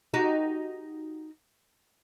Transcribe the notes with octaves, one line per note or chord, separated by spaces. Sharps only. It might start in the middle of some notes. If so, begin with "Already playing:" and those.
D#4 F#4 G4